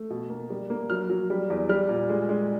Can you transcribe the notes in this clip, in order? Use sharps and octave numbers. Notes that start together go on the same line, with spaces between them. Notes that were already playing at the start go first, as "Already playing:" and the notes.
Already playing: A3
B2
A#3
G3
A#3
F#3 F6
F#3
G3
E2
G3 F6
A#2
G#3
G#3